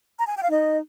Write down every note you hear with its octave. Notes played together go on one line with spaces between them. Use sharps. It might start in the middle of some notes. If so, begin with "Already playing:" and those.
A#5
G#5
G5
F5
D#4 D#5